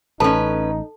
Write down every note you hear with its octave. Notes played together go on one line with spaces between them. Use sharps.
A1 C#4 D#4 A4 B4 A5